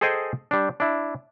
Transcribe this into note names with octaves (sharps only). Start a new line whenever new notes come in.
G#4 A4 C5 D#5 G5 G#5
G3 D4
D4 E4